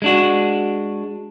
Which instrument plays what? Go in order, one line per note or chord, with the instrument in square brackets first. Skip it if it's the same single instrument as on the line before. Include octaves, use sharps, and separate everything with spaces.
[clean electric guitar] G#3 D4 F#4